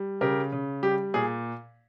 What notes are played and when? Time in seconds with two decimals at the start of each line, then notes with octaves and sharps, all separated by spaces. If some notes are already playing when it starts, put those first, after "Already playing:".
Already playing: G3
0.21 C#3 G4 A#4
0.52 C#3
0.83 G3 G4
1.14 A#2 G#4